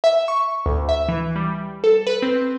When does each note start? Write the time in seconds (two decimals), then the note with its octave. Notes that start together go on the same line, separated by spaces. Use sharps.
0.04 E5
0.28 C#6
0.66 D2
0.89 E5
1.09 E3
1.36 G3
1.84 A4
2.07 B4
2.22 C4